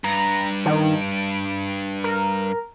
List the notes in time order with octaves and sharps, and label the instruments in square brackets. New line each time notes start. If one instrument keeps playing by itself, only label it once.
[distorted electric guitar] G2 [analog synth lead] A#5
[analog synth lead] D#3
D7
A#4